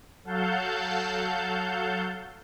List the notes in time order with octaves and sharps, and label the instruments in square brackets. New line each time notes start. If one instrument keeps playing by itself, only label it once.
[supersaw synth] F#3 A4 F5 F#5 A5 G6